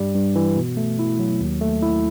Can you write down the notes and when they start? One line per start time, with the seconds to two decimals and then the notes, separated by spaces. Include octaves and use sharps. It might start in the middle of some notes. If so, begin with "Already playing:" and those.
Already playing: G2 G3
0.15 G2
0.35 E3
0.57 B2
0.77 A3
0.99 E4
1.19 F#3
1.40 D#2
1.61 A3
1.82 E4